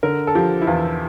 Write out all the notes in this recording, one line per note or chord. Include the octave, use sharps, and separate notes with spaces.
D3 A#4
A4
F3 G4
E4
E2 F4